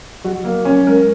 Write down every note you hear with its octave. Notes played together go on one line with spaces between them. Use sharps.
F#3 F#4
F#3 A#3
F#3 C#4
G#3 A#4